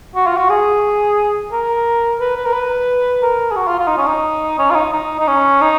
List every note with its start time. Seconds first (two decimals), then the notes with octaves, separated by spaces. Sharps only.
0.16 F#4
0.27 F4
0.37 F#4
0.50 G#4
1.52 A#4
2.20 B4
2.37 B4
2.46 A#4
2.53 B4
3.22 A#4
3.51 G#4
3.56 F#4
3.68 F4
3.79 F4
3.88 D#4
3.98 C#4
4.07 D#4
4.59 C#4
4.71 F4
4.75 D#4
4.93 D#4
5.19 D#4
5.27 C#4
5.61 D#4